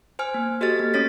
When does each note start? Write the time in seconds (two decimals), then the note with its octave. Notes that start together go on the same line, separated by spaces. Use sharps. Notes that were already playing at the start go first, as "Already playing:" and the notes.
0.19 C5 G#5 F6
0.34 A#3
0.61 F#4 G4 A4 D#5 F6 A6
0.79 A#3
0.94 A3 C#4 C#5 A6 B6